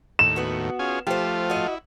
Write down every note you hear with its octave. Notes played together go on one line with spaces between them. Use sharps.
D#2 A2 E7
B3 F#4
C#4 F4 G#4
F3 A3 F4 G4 C5
F#4 D#5
E4